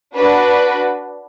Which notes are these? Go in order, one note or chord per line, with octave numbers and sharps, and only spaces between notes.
D4 F#4 B4